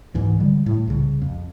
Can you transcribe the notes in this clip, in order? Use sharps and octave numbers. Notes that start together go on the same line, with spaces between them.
C#2 G#2 E3
D3 G3 G#3
A2
C2 C#3
F2